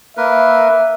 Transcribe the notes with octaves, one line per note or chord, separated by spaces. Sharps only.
A#3 A#4 B4 E5